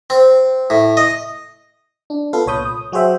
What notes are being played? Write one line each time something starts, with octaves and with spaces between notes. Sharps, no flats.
C4
A2
D#5
D4
B3 F4 A4 B4 F5
C2 A#2 C#5 B5 D#6 G6
D#6
F#3 F#4 G#4 C5 E5 G5